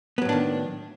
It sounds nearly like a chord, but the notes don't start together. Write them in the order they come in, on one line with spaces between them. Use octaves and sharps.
B3 F#3 A2 D4 D#3